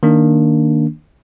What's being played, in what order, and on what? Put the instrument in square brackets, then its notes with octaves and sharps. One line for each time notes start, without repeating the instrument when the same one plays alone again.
[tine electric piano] D#3 A#3 D4